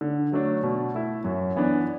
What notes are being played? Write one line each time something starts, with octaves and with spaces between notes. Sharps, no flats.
D3
F#3 A3 D4
B2
A3 E4
F#2
E3 B3 D4